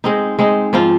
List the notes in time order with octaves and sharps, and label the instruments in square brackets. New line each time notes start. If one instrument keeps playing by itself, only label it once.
[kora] G#3 C4 D#4
G#3 C4 D#4
G#2 F3 C4 F4